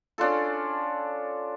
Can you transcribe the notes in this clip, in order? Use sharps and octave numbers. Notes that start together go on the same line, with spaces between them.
C#4 D4 F4 A4